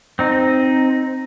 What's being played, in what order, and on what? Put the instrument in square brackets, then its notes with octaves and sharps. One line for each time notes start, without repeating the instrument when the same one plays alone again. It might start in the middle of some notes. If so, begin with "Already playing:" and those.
[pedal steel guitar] C4 D#4